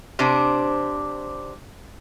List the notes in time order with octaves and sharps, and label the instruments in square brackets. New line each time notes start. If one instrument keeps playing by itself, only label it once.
[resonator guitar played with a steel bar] C3 D4 C5